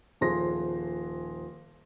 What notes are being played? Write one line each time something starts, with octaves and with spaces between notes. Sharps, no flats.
D#1 F3 G#4 C5 C6 A#6